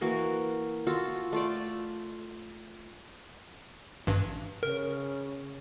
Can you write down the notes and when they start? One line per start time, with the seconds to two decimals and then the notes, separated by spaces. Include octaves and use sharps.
0.01 E3 A#3 F#4
0.87 F4 F#4 A4
1.33 A3 F4 D5
4.07 A1 G2
4.63 C#3 A#4